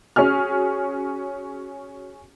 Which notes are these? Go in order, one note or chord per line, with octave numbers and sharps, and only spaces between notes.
C#4 F#4 G#4 F6